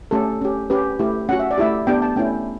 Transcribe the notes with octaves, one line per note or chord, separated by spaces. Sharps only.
A3 C#4 G4 A4
C#4 G4
C#4 G4 B4
A3 E4 G4
C#4 F#4 F#5
E5
D5
A3 E4 G4 E5
B3 D4 G4 G5
A5
A3 C#4 E4 G5